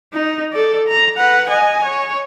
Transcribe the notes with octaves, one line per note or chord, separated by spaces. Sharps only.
D#4
A4 D5
A#5
B4 F#5
D#5 G#5
C#5